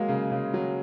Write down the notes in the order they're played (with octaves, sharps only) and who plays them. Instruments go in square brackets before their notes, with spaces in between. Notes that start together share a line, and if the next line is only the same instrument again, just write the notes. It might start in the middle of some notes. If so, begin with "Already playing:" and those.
Already playing: [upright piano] F#3 A#3 [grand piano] G#3
[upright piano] C#3
C#3
F#3